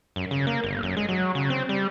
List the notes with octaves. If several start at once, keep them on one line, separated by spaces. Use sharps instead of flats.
F#2
C#3
A#3
G1
F#2
G#3
F#3
C#3
C4
G3